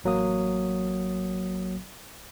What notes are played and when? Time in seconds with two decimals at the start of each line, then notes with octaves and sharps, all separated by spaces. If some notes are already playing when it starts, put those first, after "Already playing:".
0.04 A1 F#3 A#3 D#6